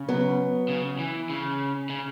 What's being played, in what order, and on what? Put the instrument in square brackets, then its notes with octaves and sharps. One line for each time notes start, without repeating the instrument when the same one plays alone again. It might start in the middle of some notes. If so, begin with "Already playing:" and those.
Already playing: [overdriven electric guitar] C#3
[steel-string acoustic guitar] F#3 B3
[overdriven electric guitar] C#3
E3
C#3
C#3